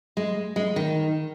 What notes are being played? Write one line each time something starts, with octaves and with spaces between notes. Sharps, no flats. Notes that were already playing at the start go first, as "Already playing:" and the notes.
G#3
G#3
D#3